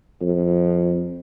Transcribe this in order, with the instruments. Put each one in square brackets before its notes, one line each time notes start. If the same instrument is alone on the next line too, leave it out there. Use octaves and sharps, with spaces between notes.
[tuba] F2